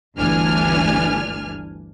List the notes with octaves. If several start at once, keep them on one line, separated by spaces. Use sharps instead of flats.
G1 D2 E3 D4 G#5 F6